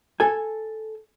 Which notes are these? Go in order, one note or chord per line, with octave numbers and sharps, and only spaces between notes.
A4 G#5